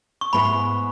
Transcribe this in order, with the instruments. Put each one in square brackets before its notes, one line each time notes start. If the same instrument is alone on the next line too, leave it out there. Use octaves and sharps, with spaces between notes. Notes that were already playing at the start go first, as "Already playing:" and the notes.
[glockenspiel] C#6
[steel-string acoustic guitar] G#2 G#3 B3 E4 [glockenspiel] B5